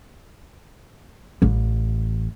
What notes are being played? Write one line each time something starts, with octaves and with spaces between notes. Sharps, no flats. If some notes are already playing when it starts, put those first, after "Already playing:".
A1